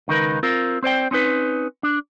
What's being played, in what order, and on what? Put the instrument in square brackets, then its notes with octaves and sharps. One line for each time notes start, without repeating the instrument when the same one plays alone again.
[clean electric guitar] C#2 D#3 D#4 A#4 B4
C4 F4 A#4
C4 C5 D5 G5
C4 C#4 D#4 B4
D4